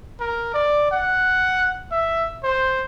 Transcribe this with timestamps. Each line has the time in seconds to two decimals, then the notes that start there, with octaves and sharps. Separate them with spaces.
0.20 A#4
0.54 D5
0.91 F#5
1.92 E5
2.44 C5